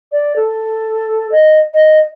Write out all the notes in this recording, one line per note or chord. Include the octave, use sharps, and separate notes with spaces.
D5
A4
D#5
D#5